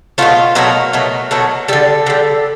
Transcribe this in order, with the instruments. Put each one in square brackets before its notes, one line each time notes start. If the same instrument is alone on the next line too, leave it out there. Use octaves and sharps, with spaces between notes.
[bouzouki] B2 F#3 A3 F4
B2 F#3 A3 A#4
B2 F#3 A3
B2 F#3 A3
D3 G3 A4
D3 G3